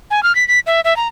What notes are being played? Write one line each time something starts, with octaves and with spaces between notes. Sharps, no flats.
G#5
F6
B6
B6
E5
E5
A#5